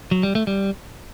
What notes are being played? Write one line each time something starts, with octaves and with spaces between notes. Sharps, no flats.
F#3
G3
A3
G3